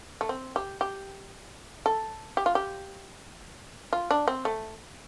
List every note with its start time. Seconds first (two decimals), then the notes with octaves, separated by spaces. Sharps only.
0.21 A3
0.29 C4
0.56 G4
0.81 G4
1.86 A4
2.37 G4
2.46 F4
2.55 G4
3.93 F4
4.11 D4
4.28 C4
4.45 A3